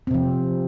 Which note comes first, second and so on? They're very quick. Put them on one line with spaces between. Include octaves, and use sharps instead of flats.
C4 C3 F3